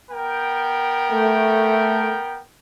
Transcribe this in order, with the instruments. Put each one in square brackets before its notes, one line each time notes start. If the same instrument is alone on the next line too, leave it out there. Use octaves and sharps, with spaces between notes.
[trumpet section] B3 A#4 G5
[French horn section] A3